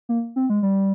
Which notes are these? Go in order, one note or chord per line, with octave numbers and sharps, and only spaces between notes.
A#3
C4
G#3
G3